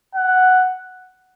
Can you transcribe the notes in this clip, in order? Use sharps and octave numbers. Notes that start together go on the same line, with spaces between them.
F#5